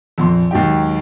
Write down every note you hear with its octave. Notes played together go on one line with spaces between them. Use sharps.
A#1 F2 C6
D#2 G#2 F#3 D#4 G4 G5